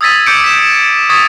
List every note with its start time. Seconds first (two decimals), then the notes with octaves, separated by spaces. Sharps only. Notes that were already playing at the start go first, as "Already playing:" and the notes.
0.01 D#6 E6 G#6 A6 B6 D#7
0.26 D6 G6 B6 C#7 D7
0.44 B6 E7
1.09 C#6 D#6 G#6 A6 B6